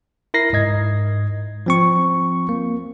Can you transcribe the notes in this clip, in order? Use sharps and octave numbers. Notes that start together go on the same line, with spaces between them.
E4 A#4 A#6 C7
G#2 D#5 G#6
F3 C4 C#6
A#3